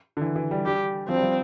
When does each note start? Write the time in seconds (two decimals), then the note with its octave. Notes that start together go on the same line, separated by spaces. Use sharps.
0.17 D3
0.21 E3
0.36 E3
0.51 G3
0.65 G3 G4
1.08 F3 C4
1.16 G3
1.23 F3